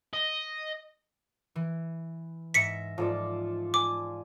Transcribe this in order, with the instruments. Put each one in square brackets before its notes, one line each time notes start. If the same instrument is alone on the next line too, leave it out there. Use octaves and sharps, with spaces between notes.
[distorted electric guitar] D#5
[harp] E3
[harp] G#2 E5 A#6 [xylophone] B6 C#7
[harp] G#2 [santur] F3 A4 D5
[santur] G#5 [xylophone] D6